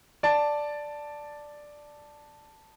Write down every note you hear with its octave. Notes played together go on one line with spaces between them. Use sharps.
D5 A5